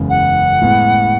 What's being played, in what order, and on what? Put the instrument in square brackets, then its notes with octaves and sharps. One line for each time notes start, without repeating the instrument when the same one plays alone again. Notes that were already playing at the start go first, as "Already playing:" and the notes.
Already playing: [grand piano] F#1 E2 C#3 G#3
[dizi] F#5
[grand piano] A2 G#3 B3